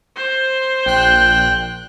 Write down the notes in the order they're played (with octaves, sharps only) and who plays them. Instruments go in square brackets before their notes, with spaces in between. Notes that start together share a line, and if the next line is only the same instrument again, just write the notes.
[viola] C5
[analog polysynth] A#1 F#6 [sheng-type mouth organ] G5